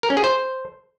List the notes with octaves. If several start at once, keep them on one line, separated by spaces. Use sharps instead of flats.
A#4
C#4
G#4
C5